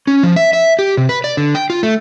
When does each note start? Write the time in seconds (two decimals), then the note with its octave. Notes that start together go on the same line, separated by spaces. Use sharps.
0.07 C#4
0.23 F3
0.36 E5
0.53 E5
0.79 G4
0.97 C3
1.09 B4
1.24 D5
1.37 D3
1.55 G5
1.70 F4
1.83 A3